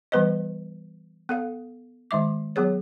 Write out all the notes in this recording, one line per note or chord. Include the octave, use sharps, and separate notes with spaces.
E3 G3 B3 B4 C5 D#5
B3 A4 F5
D#3 G#3 E5 D6
F#3 B3 G#4 C#5